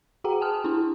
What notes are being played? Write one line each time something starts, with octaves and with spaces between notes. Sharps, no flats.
F#4 G#4 F#5 G5 A#5
G#5 A5 D#6 F6
D4 E4